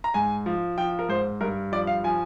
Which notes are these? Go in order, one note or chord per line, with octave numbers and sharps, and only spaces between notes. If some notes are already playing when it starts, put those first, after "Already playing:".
A#5
G#2 G#5
F3
F3 G5
A#4
G#2 C5
G2 A#4
F3 D5
F5
F3 G#5